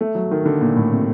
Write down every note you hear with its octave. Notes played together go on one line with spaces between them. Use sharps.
A3
F#3
D#3
D3
A#2
A2
C3